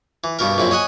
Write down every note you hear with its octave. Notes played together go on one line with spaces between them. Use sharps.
E3
G2 B2 A#4
A#1 F#2 C4 E4
C#5 D#5 F#5 G#5